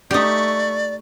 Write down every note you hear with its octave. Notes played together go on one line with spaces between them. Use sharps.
A3 D#4 G4 D5 C#6